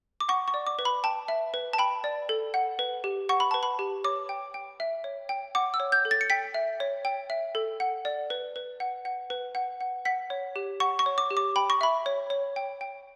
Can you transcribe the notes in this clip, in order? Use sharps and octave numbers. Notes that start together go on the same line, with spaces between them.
D6
F#5 C#6
C#6
D5
D6
B4
B5
G5 A5
E5
B4
A5
G5 B5
D5
A4
F#5
B4
G4
F#5 C#6
B5
B4 A5
B5
G4
C#5 D6
G5
G5
E5
C#5
G5
F#5 D6
E6
C#5
G6
A4
A6
C#7
G5 B6
E5
C#5
G5
E5
A4
F#5
D5
B4
B4
F#5
F#5
B4
F#5
F#5
F#5 B6
C#5
G4
F#5 C#6
C#6
C#5
D6
G4
D6
G5 B5
C#6
E5 B5
C#5
C#5
G5
G5